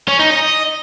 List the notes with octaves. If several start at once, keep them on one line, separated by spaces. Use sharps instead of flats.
C#4
D#4
D#5